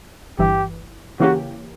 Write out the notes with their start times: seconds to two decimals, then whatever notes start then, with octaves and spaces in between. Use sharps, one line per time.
0.39 G1 G2 E3 G4
1.20 C#3 E3 A#3 C#4 F#4 G4